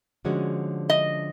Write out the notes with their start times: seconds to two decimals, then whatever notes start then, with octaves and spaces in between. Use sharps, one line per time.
0.25 D3 F3 G#3 C#4 F#4
0.90 D#5